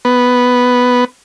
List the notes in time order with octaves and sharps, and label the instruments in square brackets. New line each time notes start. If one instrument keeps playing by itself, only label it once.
[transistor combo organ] B3